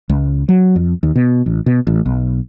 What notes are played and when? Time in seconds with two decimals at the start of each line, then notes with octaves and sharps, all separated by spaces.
0.09 C#2
0.49 F#3
0.76 F2
1.03 D#2
1.16 B2
1.46 A1
1.66 B2
1.87 A1
2.06 B1